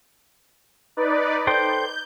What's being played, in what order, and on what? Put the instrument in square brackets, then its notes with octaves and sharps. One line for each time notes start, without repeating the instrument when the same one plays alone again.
[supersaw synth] D#4 B4 D5
[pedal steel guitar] A4 C5 G5 [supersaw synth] G6